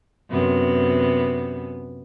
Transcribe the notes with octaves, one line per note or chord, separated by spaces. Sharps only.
F#2 C3 B3